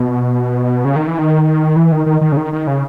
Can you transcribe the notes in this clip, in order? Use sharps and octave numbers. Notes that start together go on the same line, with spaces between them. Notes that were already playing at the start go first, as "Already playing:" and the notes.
Already playing: B2
C#3
D#3
E3
D#3
E3
D#3
D#3
D#3
C#3
D#3
D#3
C#3